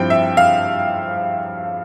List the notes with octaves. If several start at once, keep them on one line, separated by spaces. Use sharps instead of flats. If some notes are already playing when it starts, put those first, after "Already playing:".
Already playing: G2 F3 C4 E4 G5
E5
F5